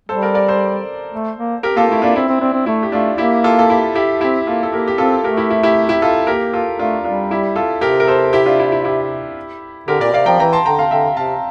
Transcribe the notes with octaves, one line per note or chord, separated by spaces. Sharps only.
G3 A4 C5
A#4 D5
A#4 D5
A4 C5
A3
A#3
G4 A#4
A#3 F4 A4
A3 E4
A#3 D4 F4
C4 E4
C4
C4 D4
C4
A3 E4
G4
A3 D4 F4
A#3 E4 G4
F4 A4
A4
E4 G4
E4 G4
C4 E4 G4
A#3 F4 A4
A4
A#3 G4 A#4
G4
C4 F4 A4
A3 G4 A#4
E4 G4
E4
E4 G4
E4 G4
F4 A4
A#3 G4 A#4
F4 A4
A3 D4 F4
G3 D4 F4
E4 G4
F4 A4
C3 G4 A#4
A#4
A4 C5
E4 G4
D4 F4
E4
E4
E4 G4
D3 G4 A#4
A#2 A#4 D5
C3 D5 F5
F3 G5 A#5
E3 G5 A#5
A5 C6
D3 G5 A#5
F5 A5
D3 E5 G5
C3 F5 A5